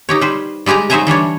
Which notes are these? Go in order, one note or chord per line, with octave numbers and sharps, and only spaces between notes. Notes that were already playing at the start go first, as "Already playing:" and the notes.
D#4 G4 C#5
G3 B4 C5
G3 G#3 G4 G#5 A#5
F#3 D#4 C5 E5 G#5 A#5
E3 G3 D4 C#5